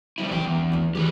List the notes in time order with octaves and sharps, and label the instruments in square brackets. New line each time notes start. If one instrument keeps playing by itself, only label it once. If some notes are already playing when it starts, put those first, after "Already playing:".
[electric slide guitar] F2 G3 E4
[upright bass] E3 F4 [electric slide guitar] B4 G5
[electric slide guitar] E2
[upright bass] D4
D2 A3
[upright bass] E3 [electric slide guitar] G4 G#4 B4